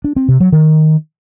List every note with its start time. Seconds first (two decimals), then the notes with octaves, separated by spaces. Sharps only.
0.04 D4
0.16 C4
0.28 C3
0.40 F#3
0.52 D#3